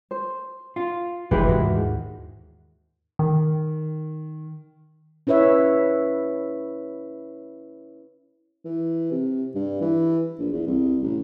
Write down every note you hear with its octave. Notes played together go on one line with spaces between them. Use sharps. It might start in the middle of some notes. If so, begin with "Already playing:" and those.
C5
F4
F1 E3 G#3 E4 G4 B4
D#2 G#2 F#4
D#3
C#4 E4 B4 C#5 E5
E3
C3
G2
E3
A#1
E2
C2
A1